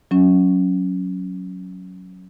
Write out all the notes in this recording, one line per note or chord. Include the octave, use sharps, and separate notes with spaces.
F#3 C#4